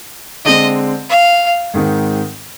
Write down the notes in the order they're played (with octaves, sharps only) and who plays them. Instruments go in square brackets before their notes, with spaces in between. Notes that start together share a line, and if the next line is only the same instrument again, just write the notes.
[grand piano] D3 G#3 C4 [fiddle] D#5
[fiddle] F5
[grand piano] G#2 D#3 G#3 C4 D#4